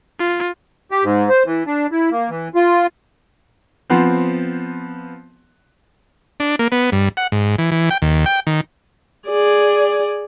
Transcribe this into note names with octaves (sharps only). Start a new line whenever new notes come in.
F4
G4
G#2
C5
E3
D4
E4
A#3
E3
F4
F3 B3 C4
D4
A#3
B3
G2
F#5
G#2
E3
E3
G5
D#2
G5
D#3
G#4 D5